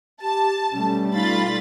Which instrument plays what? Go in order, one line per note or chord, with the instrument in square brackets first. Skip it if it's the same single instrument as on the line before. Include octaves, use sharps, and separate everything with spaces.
[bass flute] G4 [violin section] A5
[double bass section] B2 G3 A3 [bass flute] C#4
[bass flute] D#4 [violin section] F4 B5 A6